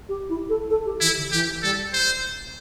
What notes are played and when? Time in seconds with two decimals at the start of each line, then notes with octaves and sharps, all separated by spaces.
0.09 G4
0.29 E4
0.49 A4
0.70 A4
0.85 G4
1.00 E3 E4
1.16 D3
1.31 E3 G4
1.62 G3 A4
1.93 C5